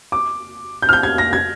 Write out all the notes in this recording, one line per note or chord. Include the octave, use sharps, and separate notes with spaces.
D6
G6
F6
G6
G#6
A#6
G#6